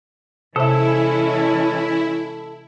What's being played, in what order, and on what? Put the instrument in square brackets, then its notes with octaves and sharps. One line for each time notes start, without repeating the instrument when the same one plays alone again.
[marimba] C3 E5 [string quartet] E3 G#3 C#4 [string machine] E4 [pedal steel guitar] A4